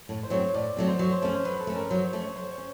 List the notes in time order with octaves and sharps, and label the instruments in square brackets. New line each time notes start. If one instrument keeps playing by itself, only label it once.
[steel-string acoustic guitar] A2
[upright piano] C5
[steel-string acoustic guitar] F#3 A3 C4 [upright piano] C#5
[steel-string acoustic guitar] A2 [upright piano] D5
[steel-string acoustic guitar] F#3 A3 C4
[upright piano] C5
[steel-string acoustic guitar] F#3 [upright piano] C#5
[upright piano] C5
[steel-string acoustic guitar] A3 C#4 [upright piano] C#5
[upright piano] C5
[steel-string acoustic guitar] F#3 [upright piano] B4
[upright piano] A4
[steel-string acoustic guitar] A3 C#4
[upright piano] A#4
[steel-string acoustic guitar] F#3 [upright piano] C5
[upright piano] C#5
[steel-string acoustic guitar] A3 C#4
[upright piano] C#5
[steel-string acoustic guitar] F#3 [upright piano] C5
[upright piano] C#5
[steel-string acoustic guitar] C#4